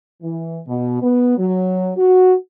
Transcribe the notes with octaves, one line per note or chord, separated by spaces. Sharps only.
E3
B2
B3
F#3
F#4